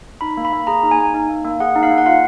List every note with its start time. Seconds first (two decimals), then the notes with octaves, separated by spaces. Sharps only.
0.21 D#4 B5
0.37 A#3
0.45 B5
0.53 A#3
0.67 G#4 A#5
0.83 D#4
0.91 G#5
0.99 A#3
1.14 D#4
1.29 A#3
1.45 A#3
1.60 G#4 F#5
1.76 D#4
1.83 F5
1.91 A#3
1.98 F#5
2.06 F4 F5